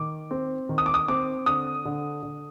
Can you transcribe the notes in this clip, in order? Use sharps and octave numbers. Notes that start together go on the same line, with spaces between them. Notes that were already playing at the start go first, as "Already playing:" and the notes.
Already playing: D#3 D6
C4
D#3
D#6
D6
D#6
C4 D6
D3 D#6
D3
D3